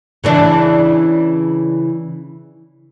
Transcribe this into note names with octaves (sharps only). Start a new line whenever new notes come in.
C#3 E3 D4